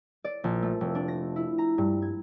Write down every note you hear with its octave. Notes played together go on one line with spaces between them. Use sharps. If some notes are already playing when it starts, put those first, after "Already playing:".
D5
A#1
A3
F1
D4
A#6
E4
A#5
G2
G#6